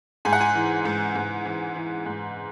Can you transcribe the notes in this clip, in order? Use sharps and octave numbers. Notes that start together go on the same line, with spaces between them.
G#2 G#5
F#5
G#5
E3
G#2
G#2
E3
E3
G#2